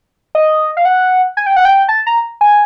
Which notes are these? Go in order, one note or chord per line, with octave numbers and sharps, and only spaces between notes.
D#5
F5
F#5
G#5
G5
F#5
G5
A5
A#5
G#5